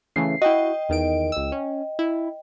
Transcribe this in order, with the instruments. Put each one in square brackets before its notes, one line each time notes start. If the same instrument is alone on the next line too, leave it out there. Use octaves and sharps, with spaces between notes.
[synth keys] C#3 E3 A3 [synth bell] C7
[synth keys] E4 F#4 [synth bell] D#5 G5
[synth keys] E2 D#3 D7
C#2 E6
C#4
E4